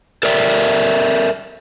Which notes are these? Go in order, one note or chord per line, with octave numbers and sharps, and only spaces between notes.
A4 A#4 D5 E5